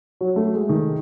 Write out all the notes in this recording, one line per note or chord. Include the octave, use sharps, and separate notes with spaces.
F#3
A3
G#3
D#3